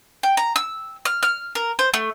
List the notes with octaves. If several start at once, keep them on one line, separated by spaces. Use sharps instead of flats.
G5
A#5
E6
F6
F6
A#4
C5
A3